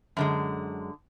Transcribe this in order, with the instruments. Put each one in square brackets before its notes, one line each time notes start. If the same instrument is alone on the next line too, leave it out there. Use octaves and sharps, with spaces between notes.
[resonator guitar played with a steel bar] F#2 D3 G#3